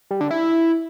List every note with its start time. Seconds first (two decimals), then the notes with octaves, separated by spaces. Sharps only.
0.11 G3
0.21 D3
0.31 E4